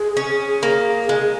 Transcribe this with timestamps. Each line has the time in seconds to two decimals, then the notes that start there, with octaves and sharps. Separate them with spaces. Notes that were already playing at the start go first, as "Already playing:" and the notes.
Already playing: G#4
0.17 C#4
0.63 A#3
1.09 G#3